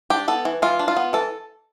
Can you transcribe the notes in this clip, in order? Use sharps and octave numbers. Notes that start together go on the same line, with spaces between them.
D4 G4
B3 A4
E3
E3 F4
D4
F4
B3
E3 A4